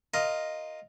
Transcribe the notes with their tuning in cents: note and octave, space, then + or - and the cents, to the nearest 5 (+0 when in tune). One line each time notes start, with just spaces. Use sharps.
F4 +0 A#4 +0 D#5 +0